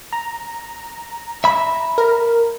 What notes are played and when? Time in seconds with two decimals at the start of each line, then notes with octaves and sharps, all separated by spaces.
0.12 A#5
1.44 E5 B5
1.98 A#4